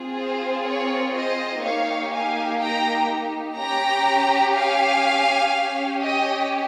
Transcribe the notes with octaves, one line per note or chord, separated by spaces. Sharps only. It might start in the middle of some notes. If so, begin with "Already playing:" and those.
Already playing: C4 F4 G#4
C5
A#4 C#5
C5 D#5
A#3 D#4 G4 C#5 F5
F5 G#5
G5 A#5
C#4 G4 G5 A#5
F5 G#5
C#4 G4
D#5 G5